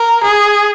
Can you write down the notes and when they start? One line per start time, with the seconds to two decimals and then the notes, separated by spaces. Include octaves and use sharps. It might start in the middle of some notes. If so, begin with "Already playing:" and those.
Already playing: A#4
0.24 G#4